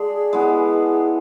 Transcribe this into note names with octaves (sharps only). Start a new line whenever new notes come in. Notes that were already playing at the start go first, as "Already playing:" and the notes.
Already playing: D3 G#3 D4 G#4
E3 G#3 B3